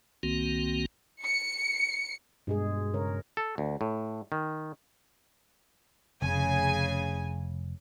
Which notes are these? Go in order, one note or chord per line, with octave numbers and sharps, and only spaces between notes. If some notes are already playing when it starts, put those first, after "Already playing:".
C2 D#3 A#3 C4 F#4
C#7
G2 B2 G#3 G#4
C#3 A#4 C#5
A4
D2
A2
D#3
F1 C#3 G#5